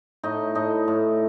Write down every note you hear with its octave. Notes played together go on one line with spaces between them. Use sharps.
A2 D#4 D#5
A2 D#4 D#5
A2